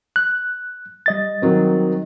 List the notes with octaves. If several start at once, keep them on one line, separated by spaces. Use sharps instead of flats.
F#6
G3 D#5 A6
D#3 F#3 C4